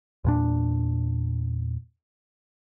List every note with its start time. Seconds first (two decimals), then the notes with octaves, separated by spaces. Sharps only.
0.24 E2 A#2 D4